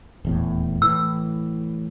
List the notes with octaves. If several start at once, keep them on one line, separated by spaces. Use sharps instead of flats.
D#1 E2 A2
A2 E3 E6